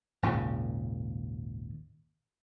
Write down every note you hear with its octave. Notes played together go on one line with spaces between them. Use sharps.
G#1 D#2 A#2 C#3